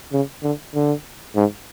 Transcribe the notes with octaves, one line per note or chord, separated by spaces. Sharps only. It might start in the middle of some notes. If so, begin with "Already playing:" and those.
C#3
D3
D3
G#2